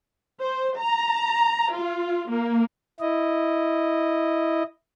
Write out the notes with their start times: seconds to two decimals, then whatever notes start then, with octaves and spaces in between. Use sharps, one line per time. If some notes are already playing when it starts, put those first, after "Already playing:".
0.42 C5
0.79 A#5
1.73 F4
2.30 A#3
3.00 E4 D#5